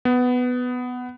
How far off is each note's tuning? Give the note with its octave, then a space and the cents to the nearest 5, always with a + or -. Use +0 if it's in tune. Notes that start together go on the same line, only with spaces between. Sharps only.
B3 +10